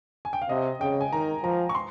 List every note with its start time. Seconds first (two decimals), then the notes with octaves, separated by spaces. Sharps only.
0.25 G#5
0.33 G5
0.42 F5
0.49 C3 D#5
0.81 C#3 G5
1.01 G#5
1.13 D#3 A#5
1.43 F3 A#5
1.69 C#6
1.75 C6